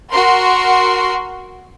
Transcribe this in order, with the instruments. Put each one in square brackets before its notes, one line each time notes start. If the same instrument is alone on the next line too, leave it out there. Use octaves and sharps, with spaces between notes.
[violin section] F#4 A#4 C6